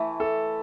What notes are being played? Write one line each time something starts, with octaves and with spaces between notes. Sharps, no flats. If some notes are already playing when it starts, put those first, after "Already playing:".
Already playing: E3 A3 E4
A4